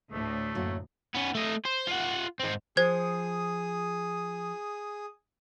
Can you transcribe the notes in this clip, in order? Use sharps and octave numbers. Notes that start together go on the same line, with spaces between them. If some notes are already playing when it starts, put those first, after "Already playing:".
D2 A2 A3
F#2 F#3 A#3
B3 C#4
A3 D#5
C5
F4 F#5
G#2 C4
F3 G#4 C5 D#6 G#6